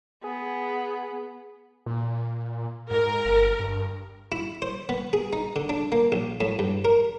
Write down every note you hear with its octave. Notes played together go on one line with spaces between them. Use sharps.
B3 G#4
A#2
G#2 A#4
G1
G2
E4
C5
B3
G#4
D#4
D3
D4
A#3
A#1
A2
G2
A#4